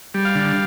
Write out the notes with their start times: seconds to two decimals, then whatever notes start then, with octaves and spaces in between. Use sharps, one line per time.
0.14 G3
0.25 F5
0.35 D3